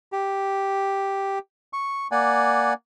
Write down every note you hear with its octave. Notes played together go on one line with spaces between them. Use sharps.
G4
C#6
A#3 D5 F#5 G#5